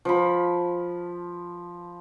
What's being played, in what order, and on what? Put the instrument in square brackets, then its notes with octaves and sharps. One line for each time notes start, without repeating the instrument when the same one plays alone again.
[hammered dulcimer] F3 B5